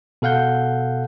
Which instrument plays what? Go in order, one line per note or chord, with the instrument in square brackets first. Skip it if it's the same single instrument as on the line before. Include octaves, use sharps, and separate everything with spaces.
[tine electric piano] B2 A4 F5 F#5 G6